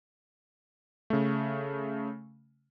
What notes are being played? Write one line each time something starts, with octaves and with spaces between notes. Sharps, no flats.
C#3 A3